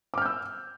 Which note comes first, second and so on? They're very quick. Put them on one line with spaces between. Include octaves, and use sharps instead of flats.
D6 F6 G6 E6